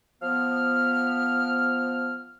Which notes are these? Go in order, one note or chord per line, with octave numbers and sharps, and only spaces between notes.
F3 B3 F6